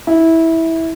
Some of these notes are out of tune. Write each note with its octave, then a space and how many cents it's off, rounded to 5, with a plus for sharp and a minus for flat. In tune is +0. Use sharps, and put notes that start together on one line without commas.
E4 -15